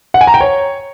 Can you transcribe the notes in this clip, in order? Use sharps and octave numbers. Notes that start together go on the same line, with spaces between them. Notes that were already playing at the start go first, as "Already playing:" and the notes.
F#5
G#5
A#5
G5
C#5